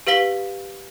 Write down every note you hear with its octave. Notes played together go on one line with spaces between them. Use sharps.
G4 B4 F5 B6 G7